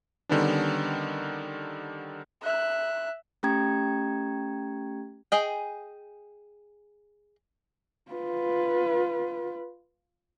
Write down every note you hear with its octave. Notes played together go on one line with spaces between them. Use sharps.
D3 D#3 G3 B3 C#4 D4
E5 F#6
A3 C#4 G4 G5 A#5 G#6
G#4 D#5 G5
F4 B4